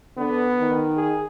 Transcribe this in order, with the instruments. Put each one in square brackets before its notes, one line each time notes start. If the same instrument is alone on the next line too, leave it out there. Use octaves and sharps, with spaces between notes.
[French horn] D3 [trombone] B3
[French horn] D#3
[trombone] G#4